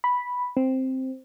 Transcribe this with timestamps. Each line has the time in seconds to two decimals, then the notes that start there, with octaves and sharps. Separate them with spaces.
0.04 B5
0.57 C4